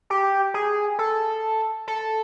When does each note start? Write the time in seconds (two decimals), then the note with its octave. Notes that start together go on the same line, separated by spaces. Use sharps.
0.10 G4
0.54 G#4
0.99 A4
1.87 A4